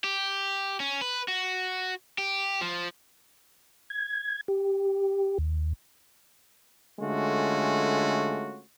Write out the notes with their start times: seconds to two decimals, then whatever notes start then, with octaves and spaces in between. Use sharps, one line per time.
0.04 G4
0.80 C#4
1.01 B4
1.28 F#4
2.18 G4
2.61 F3
3.90 G#6
4.48 G4
5.38 D#2
7.00 D3 G#3 A3 C#4 F4 F#4